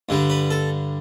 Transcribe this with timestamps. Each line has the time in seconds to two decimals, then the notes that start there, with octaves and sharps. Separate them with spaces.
0.09 G2 D3 G3
0.30 B4
0.51 A4